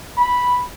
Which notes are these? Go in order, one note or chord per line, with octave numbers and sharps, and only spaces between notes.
B5